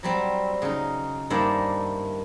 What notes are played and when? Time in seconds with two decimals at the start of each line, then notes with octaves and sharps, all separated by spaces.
0.03 F#3 G3 C4
0.62 C#3 D#4
1.30 G2 D#3 A#3 C5 D5 E5